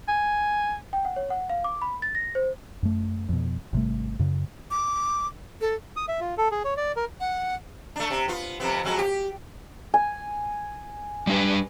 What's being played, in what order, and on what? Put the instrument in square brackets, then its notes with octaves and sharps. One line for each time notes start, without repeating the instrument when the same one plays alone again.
[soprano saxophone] G#5
[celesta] G5
F#5
C#5
F#5
F5
D6
B5
A6
A#6
C5
[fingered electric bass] F#2 A3
F2 B2
G#1 C3 G3 A3
F#2 C#3
[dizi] D6
A4
[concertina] D#6
E5
F4
A4
G#4
C#5
D5
A#4
[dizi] F#5
[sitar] A3 D4
C3
B3 F4
F2 C3 B3
F2 F#3 G#3
G4
[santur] G#5
[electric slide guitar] G3 D4 B4